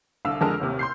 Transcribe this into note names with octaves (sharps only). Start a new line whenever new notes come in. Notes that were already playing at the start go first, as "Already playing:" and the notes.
C2 D3 F5 E6
F2 D3 G#3 A#4 A5 F6
A1 D#2 C3
C6 G6 C7